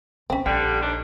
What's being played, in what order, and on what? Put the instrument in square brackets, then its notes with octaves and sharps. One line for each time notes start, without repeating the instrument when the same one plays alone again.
[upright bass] B1 [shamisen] C4 C#4
[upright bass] A#1 [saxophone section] D3 G3 [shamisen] G5
[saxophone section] D#2 D4